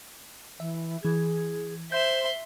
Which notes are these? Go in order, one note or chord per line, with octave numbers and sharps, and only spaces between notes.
E3 E5
E3 G#4 G#6
C5 E5 C6 G6 E7